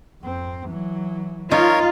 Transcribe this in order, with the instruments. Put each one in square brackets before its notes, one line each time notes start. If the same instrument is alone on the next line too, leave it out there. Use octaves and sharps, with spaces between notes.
[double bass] F2 C4
E3 F#3
[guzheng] D#4 [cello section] F4 [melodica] A#4 C#5